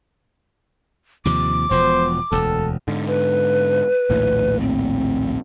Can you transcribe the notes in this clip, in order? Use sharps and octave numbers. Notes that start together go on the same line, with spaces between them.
D#2 C3 F3 D6
E1 B2 F3 C5
E1 D2 A4
G#2 D3
B4
A#1 D#2 A2
C4